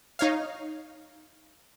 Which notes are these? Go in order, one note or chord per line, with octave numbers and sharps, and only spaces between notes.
D#4 C#5 F5